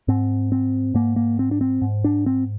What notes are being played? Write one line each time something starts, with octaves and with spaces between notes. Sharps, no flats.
G#2 C4
C4
G#2 A#3
A#3
C4
D4
C4
G#2
D4
C4